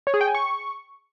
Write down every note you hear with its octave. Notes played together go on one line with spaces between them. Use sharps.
C#5
G#4
G5
G#5
C#6